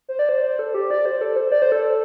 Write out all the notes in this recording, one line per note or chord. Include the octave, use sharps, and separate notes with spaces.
C5
D5
C5
A4
G4
D5
C5
A4
C5
D5
C5
A4